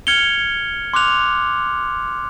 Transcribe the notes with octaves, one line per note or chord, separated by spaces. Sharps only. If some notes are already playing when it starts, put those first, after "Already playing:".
F6 G#6 C#7 F7 G7
C6 D6 F6 F#6 F7